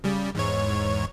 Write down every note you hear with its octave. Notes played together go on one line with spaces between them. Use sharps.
C#3 G3
E2 G#2 C#5